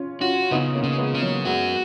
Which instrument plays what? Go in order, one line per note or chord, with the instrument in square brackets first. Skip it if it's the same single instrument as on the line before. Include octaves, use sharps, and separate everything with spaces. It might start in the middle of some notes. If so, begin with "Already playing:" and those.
Already playing: [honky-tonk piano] C#4 F4
[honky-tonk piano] C#4 F4 [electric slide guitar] F#4
[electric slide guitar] C#3 [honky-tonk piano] B3 D#4
[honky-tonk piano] A#3 C#4
[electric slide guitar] C#3
[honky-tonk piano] G#3 B3
[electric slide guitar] C#4
[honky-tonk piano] F#3 A#3
[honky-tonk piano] G#3 B3 [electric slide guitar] F#4